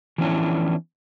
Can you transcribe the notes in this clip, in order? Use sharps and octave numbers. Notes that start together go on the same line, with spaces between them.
E3 F3 B3 C#4 D4 E4